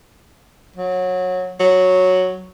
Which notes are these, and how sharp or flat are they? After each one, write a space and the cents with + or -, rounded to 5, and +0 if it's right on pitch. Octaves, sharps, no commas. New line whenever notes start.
F#3 -20
F#3 -5